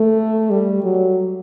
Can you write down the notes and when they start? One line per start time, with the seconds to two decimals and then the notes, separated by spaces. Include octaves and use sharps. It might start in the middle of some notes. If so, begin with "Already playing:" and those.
Already playing: A3
0.50 G3
0.84 F#3